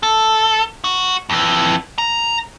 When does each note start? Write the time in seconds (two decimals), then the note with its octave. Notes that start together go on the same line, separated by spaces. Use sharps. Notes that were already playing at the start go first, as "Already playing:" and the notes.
0.03 A4
0.84 F#4
1.30 F2 E3
1.98 A#5